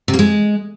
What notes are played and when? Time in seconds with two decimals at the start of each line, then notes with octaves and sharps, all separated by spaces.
0.08 C3
0.13 A#3
0.19 G#3